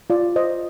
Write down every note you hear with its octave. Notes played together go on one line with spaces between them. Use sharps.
F4 D5
C5 D#5